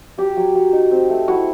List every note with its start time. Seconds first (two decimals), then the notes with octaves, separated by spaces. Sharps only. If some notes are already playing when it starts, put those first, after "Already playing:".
0.18 F#3 G4
0.37 F#3
0.55 F#3
0.73 D#4
0.91 C4
1.10 A3
1.28 E4 F#4